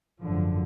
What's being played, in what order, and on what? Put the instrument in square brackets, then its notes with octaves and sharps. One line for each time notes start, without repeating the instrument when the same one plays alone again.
[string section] G#1 F#2 D3 F3